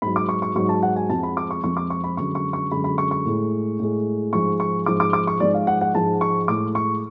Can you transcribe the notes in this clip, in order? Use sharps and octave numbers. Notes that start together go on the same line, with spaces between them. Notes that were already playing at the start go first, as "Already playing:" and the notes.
G#2 F#3 B5
D6
C#6
C#6
G#2 F#3 C#6
A5
F#5
G#5
F2 F3 G#3 A5
B5
D6
C#6
F2 F3 G#3 C#6
D6
C#6
B5
F#2 D3 G#3 C#6
C#6
C#6
F#2 D3 G#3 B5
B5
C#6
C#6
A2 G#3
A2 G#3
G#2 F3 G#3 C#6
C#6
G#2 F3 G#3 D6
D6
D6
C#6
G#2 F3 G#3 D5
F5
F#5
F#5
G#2 F3 G#3 A5
C#6
A2 G#3 D6
C#6